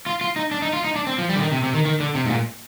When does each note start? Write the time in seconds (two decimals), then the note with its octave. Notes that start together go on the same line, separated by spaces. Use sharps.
0.06 F4
0.21 F4
0.36 D#4
0.51 D4
0.62 D#4
0.73 F4
0.84 D#4
0.96 D4
1.07 C4
1.18 F3
1.29 G3
1.35 D3
1.41 D#3
1.52 C3
1.63 C3
1.74 D#3
1.86 D#3
2.00 D3
2.15 C3
2.26 G#2
2.30 A#2